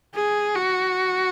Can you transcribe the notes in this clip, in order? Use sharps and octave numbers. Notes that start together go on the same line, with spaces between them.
G#4
F#4